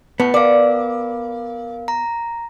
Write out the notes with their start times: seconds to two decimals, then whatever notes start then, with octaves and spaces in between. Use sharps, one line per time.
0.20 A2 B3 C#7
0.34 A#4 D5 F5
1.88 A#5